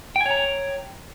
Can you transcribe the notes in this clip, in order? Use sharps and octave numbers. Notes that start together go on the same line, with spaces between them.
C#5 G5 G#5 A#5